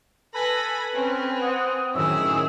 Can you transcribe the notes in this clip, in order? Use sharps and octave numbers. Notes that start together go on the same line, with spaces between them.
A4 B4 G#5 B5 A#6
C4 C#4
F#5 D#6
F#2 A2 D#3 E4 G#4 C#5 E6